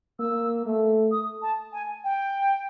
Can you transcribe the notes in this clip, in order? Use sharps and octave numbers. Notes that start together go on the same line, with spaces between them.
A#3 E6
A3
D#6
A5
G#5
G5